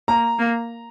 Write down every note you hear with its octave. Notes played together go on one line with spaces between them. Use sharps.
A#3 A#5
A#3